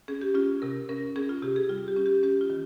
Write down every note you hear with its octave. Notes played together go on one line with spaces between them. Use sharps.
C#4 G#4
G4
C#4 F4
C3 A#4
C#4 A#4
C#4 G#4
F4
C3 G4
G#4
G3 F4
G4
C#4
G4
C#4 G4
F4
D#3